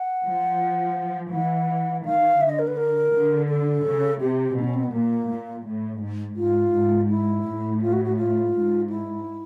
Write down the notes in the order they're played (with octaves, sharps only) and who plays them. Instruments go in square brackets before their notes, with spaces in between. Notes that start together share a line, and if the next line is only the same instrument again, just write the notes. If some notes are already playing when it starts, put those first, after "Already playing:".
Already playing: [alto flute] F#5
[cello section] F3
[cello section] E3 [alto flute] F#5
[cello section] D#3 [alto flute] F5
[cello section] D3 [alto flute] E5
[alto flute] D#5
A#4
B4
A#4
[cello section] D3
[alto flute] A4
[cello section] C#3
[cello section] C3 [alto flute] G4
[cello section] B2 [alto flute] D4
[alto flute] C#4
C4
B3
[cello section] A#2 [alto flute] A#3
[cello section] A#2
A2
G#2
[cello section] G#2 [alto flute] F4
[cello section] G#2
[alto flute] E4
[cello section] A2
[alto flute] F4
F#4
F#4
F4
[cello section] G#2
[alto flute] E4